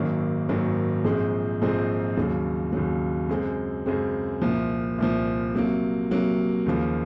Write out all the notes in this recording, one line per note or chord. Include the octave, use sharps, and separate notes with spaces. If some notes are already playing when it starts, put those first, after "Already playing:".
Already playing: G#1 F#2 D#3 F#3 A#3
G#1 F#2 D#3 F#3 A#3
A#1 G#2 F3 G#3 C4
A#1 G#2 F3 G#3 C4
D#2 C#3 F#3
D#2 C#3 F#3
F#2 C#3 G#3 C4
F#2 C#3 G#3 C4
C2 A#2 F3
C2 A#2 F3
C3 F#3 A#3
C3 F#3 A#3
D#2 C#3 F3 A#3